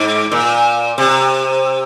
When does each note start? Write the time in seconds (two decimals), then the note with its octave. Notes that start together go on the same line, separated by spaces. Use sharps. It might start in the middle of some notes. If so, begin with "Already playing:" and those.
Already playing: G#2
0.32 A#2
0.98 C3